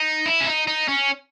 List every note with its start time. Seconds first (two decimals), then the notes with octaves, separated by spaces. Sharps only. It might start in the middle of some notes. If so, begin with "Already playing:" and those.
Already playing: D#4
0.26 E4
0.41 C#4
0.47 D#4
0.67 D#4
0.88 C#4